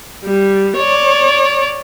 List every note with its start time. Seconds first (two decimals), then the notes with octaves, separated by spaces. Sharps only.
0.24 G3
0.77 C#5 D5